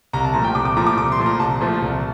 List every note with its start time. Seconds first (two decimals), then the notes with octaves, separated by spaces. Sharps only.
0.13 C2 A#5
0.24 A5
0.34 A#2 F3 A3 A#5
0.44 G5
0.55 C2 D6
0.65 D6
0.76 A#2 F3 A3 A#5
0.87 D6
0.97 C2 D6
1.12 C6
1.19 A#2 F3 A3
1.26 A#5
1.39 C2 A5
1.61 A#2 F3 A3
1.82 C2